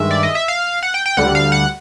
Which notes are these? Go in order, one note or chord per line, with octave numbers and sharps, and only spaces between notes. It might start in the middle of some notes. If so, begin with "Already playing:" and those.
Already playing: G2 D#3 G#3 E5
D5
D#5
E5
F5
F#5
G5
G5
D2 D3 G3 F#5
F5
F#5